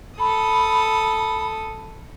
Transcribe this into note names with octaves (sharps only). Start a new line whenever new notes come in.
A4 B5 D#6